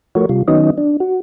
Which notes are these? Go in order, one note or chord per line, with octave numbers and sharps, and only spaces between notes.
F3 A3 F#4 A#4 C#5
C3 G3 F4
D#3 F#3 B3 C#4 D#4 D#5
D4
F#4